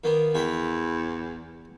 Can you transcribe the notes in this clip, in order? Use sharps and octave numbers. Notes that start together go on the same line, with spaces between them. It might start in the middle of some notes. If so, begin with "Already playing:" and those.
D#3 A#3 B3
E2 E5 G5 B5